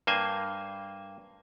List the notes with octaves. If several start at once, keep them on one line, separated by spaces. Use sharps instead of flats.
G2 A#3 C5 G#5